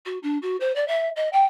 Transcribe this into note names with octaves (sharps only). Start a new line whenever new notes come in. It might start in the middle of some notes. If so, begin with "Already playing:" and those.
F#4
D4
F#4
C5
D5
E5
D#5
G5